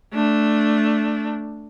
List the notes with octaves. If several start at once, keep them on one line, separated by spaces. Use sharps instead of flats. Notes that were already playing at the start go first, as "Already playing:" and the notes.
A3 D4